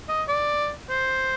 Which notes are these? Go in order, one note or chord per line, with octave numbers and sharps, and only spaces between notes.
D#5
D5
C5